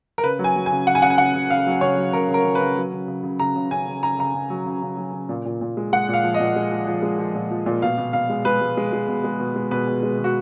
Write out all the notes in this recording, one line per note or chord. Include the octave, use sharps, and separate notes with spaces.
A#4
C#3 B4
F#3
G#5
F#3
G#5
C#3
C#3 F#5
G#5
C#3 F#5
G#5
C#3 F#5
C#3
C#3 F5
F#3
C#3 C#5
F#3
C#3 A#4
C#3
A#4
C#3
B4
C#3
F#3
C#3
C#3
C#3
C#3 A#5
C#3
C#3 G#5
C#3
C#3 A#5
C#3 A#5
C#3
F#3
C#3
C#3
F#3
C#3
A#2
A#2
A#2
G#3
G#3 F#5
A#2
F5
F3
D#5
A#2
G#3
F3
F3
G#3
F3
A#2
F3
A#2
B2 F5
B2
B2 F5
G#3
G#3 B4
G#3
G#3
G#3
B2
G#3
B2
G#3
B2 B4
B2
G#3
B2
F#4